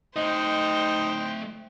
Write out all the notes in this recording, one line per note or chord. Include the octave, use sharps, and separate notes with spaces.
A3 D#4 C5 D#5 G5